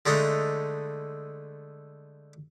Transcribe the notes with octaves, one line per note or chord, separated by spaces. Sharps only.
D3 G#3 A3 D#4